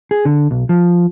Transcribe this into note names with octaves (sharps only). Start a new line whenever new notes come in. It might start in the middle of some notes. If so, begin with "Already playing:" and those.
G#4
D3
B1
F3